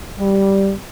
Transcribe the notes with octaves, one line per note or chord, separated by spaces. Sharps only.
G3